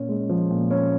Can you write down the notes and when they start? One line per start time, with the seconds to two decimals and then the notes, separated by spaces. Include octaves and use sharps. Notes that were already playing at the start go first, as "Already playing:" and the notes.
Already playing: A#2 C#4
0.09 G#3
0.29 F3
0.50 A#2
0.71 C#4